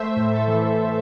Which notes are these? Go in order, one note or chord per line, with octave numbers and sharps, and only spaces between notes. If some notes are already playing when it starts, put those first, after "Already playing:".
Already playing: A3 C5 E5
A2
A4
E3